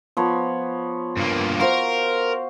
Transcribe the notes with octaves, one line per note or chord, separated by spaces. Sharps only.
F3 B3 C#5
G2 A#3
F#4 A#4 C5 F5